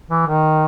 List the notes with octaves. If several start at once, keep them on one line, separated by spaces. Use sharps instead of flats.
E3
D#3